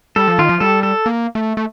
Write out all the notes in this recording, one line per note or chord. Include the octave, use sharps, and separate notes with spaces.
G3 A4
F3
D#3 F4
F3
G3 A4
A4
A#3
A3
A3